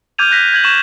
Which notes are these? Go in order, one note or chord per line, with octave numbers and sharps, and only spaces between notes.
D6 F6 G6 G#6 D#7 F7
F#6 A#6 B6
G6 G#6 F#7
C#6 E7 F#7